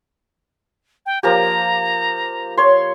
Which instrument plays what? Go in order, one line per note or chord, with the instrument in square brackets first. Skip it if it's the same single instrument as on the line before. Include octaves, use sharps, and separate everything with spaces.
[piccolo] G5
[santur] F3 A#3 G4 [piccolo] A#5
[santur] C#5 C6